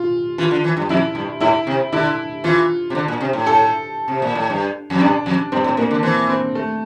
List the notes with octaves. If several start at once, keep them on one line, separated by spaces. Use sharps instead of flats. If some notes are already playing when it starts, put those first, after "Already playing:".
Already playing: F4
E3 F4
D3
E3
G2
F2 E4
G2
A2 E4
C3
D3 E4
E3 F4
C3
D3
A#2
C3
A2
A4
C3
A#2
A2
G2
F2
G2 D4
F2
G2 C4
A2
A#2 A#3
D3
E3 C4
C4
A3